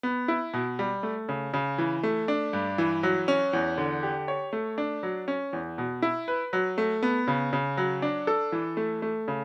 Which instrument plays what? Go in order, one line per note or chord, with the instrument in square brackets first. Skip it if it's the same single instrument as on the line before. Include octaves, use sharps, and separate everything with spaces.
[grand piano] B3
E4
B2
G3
A3
C#3
C#3
E3
A3
D4
G2
E3
F#3
C#4
E2
D3
G4
C#5
A3
D4
F#3
C#4
E2
B2
E4
B4
F#3
A3
B3
C#3
C#3
F#3
D4
A4
E3
A3
A3
C#3